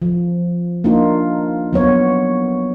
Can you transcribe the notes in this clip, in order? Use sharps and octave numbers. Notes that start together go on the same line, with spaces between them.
F3
A#3 D4 D#4 F4
F#3 B3 C#5